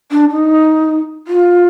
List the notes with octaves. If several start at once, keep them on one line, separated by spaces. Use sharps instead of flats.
D4
D#4
F4